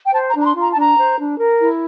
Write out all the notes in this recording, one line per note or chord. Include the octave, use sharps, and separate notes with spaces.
G5
C5 A5
A#5
D4
A#5
C6
F4
A#5
A5
D4 A#5
C5
D4
A#4
E4